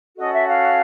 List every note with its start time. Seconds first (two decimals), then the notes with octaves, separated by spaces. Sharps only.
0.17 C#4 F#4 A4 D#5
0.31 E5
0.46 F5